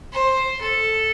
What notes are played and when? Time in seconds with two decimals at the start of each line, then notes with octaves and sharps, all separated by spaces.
0.12 C5
0.61 A4